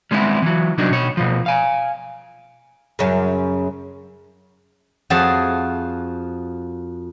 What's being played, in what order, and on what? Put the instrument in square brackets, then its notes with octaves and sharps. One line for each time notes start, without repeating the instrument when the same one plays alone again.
[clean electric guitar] G3 G#3 B3 C4 E4
E3 F#3
C2 F#3 D4 D#4
B2 C#5
B2 F3
F5 G#5
[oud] F#2 C#3
[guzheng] F2 F3 F#4 G#4 E5 A5